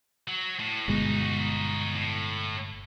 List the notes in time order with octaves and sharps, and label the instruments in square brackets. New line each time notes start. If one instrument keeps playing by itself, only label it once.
[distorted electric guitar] F#3
A2
[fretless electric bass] G1 B2 G#3 [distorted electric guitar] D#4 F#4
[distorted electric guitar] A2